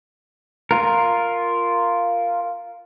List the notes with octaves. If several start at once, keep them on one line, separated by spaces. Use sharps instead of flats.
F4 A#4